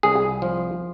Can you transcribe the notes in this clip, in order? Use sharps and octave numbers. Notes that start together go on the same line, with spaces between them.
C2 G#4
F3